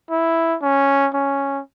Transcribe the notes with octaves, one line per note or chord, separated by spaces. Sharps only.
E4
C#4
C#4